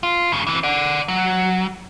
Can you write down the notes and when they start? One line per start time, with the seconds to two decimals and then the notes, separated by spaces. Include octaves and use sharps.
0.03 F4
0.32 G2 C#3
0.47 E3 C4
0.63 D5 F#5
1.08 F#3